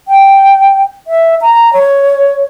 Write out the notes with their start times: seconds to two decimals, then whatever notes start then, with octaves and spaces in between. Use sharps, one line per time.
0.08 G5
1.07 E5
1.41 A#5
1.73 C#5